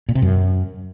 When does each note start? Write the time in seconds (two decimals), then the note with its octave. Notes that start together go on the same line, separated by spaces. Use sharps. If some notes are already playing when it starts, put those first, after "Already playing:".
0.09 A#2
0.15 C3
0.22 F#2